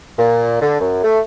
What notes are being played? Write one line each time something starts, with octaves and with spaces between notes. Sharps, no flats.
A#2
D3
F#2
A3